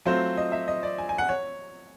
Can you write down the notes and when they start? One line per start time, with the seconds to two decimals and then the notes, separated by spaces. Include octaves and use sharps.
0.05 F#3 A3 C4 F4 C5
0.37 D#5
0.52 E5
0.68 D#5
0.83 D5
0.98 G#5
1.09 G#5
1.18 F#5
1.29 C#5